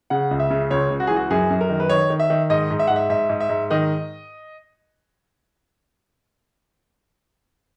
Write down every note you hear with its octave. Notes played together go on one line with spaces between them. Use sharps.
C#3 F#5
C#2
E5
C#3
C#2 C#5
C#2
F#4
E3 G#4
F#4
F#2 G#4
F#2
A#4
D#3
B4
D#3 C#5
D#3
E5
D#3
G#2 D#5
G#2
E5
G#2 F#5
E5
G#2 E5
G#2
E5
G#2
D#3 D#5